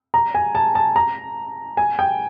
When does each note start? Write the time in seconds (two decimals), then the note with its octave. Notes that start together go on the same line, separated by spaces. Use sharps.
0.14 A#5
0.35 G#5
0.55 A5
0.75 A5
0.96 A#5
1.77 G#5
1.99 G5